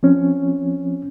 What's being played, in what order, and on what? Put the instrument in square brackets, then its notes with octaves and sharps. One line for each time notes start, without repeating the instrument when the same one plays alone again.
[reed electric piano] F3 C4 C#4